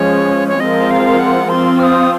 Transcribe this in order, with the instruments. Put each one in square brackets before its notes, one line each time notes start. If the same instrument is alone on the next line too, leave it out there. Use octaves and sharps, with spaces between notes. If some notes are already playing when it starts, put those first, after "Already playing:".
Already playing: [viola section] F3 G#3 C#4 [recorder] C#5
[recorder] C#5
[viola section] F3 G#3 C4 F4 A#4 [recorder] D#5
[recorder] F5
F#5
[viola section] F3 C4 F4 [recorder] C6
[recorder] F6
D#6